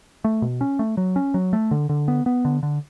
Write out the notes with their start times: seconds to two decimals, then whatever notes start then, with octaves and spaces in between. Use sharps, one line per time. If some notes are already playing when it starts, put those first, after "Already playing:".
0.24 A3
0.42 B2
0.61 C#4
0.79 A3
0.97 F#3
1.16 C#4
1.34 F#3
1.53 A3
1.71 D3
1.89 D3
2.08 B3
2.26 B3
2.45 D3
2.63 D3